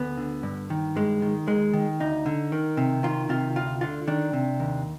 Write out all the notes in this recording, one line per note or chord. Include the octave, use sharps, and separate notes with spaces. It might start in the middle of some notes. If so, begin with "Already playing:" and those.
Already playing: D2 B3
D3
G2
D#3
G2 G#3
D#3
D#2 G#3
D#3
D2 D#4
D3
D#3
C3
D#3 F4
C3 F4
D2 F4
D3 F4
D#3 D4
C3
D#2